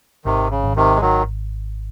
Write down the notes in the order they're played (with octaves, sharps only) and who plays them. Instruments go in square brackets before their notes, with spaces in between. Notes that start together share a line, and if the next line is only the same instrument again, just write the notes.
[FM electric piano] G#1 [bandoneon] C3 D#3
[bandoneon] C#3
[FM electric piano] G#1
[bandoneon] C3 D#3
G#3
D#3 F#3